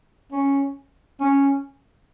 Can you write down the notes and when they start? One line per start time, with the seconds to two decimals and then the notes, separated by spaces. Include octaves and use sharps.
0.32 C#4
1.20 C#4